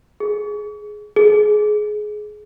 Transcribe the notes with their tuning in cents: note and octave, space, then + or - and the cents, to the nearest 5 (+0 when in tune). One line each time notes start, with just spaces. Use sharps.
G#4 +10
G#4 +20